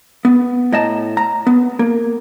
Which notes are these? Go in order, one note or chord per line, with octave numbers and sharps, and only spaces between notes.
B3
A2 D#5 A5 A#5
A#5
B3
A#3